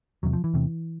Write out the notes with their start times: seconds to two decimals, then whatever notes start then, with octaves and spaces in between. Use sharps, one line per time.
0.23 E2 C3 F#3
0.33 F3
0.44 E3
0.54 E2 C3